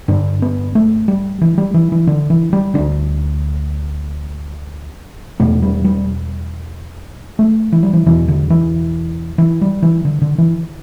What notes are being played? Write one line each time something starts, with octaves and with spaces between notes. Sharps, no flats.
G2 D3 D4
B3
A3
G3
E3
G3
E3
E3
D3
E3
G3
D2 D3 D4
E2 B2 A3
G3
G3
A3
E3
G3
E3
E2 B2 E3
D3
E3
E3
G3
E3
D3
D3
E3